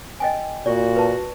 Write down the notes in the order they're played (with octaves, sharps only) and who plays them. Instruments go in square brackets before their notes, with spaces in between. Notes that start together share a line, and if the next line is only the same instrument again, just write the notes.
[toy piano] D#5 G5 G#5
[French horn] A#2 [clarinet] F#4 [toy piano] D5
[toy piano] B4 A5